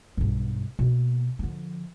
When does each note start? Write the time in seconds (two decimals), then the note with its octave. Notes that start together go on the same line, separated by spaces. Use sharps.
0.17 B1 G2
0.79 B2 A#3
1.39 D3 F3